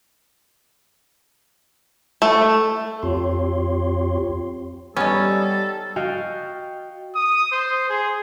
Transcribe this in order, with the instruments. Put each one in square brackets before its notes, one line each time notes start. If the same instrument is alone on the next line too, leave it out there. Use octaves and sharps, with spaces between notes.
[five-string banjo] A3
[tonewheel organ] F2 C4 F4 G4 C#5 C6
[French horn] G3 [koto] B3 D#4 [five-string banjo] C#4 [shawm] A4
[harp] F#4 D#5 F5 G5
[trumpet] D#6
C5
G#4